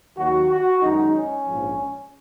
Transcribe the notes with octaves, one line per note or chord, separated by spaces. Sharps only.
D#2 D#3 F#3 F#4
F#4
F#2 D#3 G#3 D#4
C#4
A#1 G#2 F3